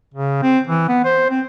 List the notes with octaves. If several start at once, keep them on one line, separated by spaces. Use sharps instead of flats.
C#3
C4
E3
B3
C5
C4